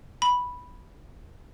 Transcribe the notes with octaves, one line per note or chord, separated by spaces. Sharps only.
B5